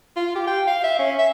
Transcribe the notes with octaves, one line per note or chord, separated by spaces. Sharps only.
F4
G4
G5
F5
E5
C#4
E5